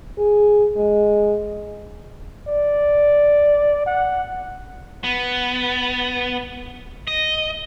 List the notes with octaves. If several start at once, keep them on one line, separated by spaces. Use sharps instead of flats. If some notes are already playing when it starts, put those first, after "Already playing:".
G#4
G#3
D5
F#5
B3
D#5